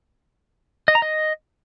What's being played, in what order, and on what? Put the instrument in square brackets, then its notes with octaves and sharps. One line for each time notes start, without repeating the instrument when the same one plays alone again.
[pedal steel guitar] D#5
A#5
D#5